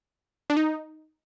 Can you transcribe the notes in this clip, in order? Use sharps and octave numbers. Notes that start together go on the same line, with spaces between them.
D4
D#4